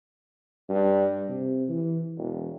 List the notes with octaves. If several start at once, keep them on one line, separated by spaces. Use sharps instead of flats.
G2
C3
E3
E1